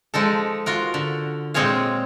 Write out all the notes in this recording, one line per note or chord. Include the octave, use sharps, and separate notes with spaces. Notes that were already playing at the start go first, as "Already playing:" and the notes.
F3 G#3 D#4 A4
F4 F#4 A#4
D3
A#2 G#3 C4 G#4 C#5 F5